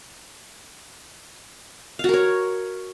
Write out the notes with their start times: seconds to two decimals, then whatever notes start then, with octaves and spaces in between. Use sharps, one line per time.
1.99 F5
2.04 F#4
2.09 A#4
2.13 C#5